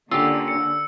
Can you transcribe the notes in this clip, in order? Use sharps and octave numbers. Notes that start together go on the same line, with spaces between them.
D3 A#3 C#4 F4 G4 E6
C#7